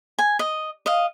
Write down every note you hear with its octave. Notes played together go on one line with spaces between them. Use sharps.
G#5
D#5
D#5 F5